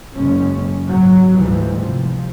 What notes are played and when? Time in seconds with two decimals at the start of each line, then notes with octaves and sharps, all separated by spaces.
0.15 F#1 G#3 C#4
0.86 G#1 F#3
1.36 D2 G#2 E3 F3 G3
1.81 C3 F3